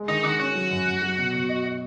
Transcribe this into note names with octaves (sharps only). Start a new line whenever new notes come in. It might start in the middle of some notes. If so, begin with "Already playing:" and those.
Already playing: G#3
D#3 D#4
D#3 F#4
C#4 F#4
F#3
F#2
F#2
F#3
B2
B2
D#5
D#5